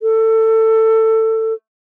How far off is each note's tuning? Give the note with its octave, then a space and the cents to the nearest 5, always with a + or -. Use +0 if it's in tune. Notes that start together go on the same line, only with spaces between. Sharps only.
A4 +20